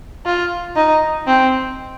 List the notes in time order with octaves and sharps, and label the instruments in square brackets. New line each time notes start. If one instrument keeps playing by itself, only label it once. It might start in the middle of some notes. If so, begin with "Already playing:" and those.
[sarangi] F4
D#4
C4